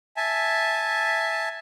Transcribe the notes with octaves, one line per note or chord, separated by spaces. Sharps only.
E5 G#5 A5